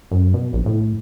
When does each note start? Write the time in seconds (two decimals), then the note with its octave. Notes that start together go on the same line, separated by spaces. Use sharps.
0.11 F#2
0.34 B2
0.53 A#1
0.66 A2